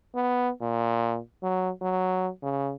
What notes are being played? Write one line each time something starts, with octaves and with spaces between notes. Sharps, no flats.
B3
A#2
F#3
F#3
C#3